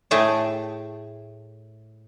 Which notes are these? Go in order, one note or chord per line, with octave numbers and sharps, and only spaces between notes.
A2 A3 G#4 G5 A5